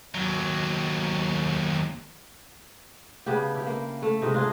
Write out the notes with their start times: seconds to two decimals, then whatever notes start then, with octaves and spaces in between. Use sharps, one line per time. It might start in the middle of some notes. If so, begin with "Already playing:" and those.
0.15 D#2 F#3
3.26 C#3 B3 D4 G4
3.54 E4 G4
3.66 A#3
4.02 A3
4.22 G#2 C3 D#4
4.34 D4 F4 G#4 D#5